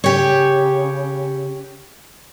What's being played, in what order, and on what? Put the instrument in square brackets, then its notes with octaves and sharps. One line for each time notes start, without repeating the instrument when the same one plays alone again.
[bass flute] C#3 [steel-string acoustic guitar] G4 C#5